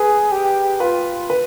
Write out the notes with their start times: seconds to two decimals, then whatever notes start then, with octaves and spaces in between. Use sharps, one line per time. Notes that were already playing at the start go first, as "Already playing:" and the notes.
Already playing: G#4 B4
0.32 G4
0.80 F4 B4
1.30 B4